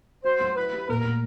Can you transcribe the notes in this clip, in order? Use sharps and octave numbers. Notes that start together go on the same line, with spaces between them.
F#4 C5
F#3
E4 B4
G4
A#2 A#4
A#2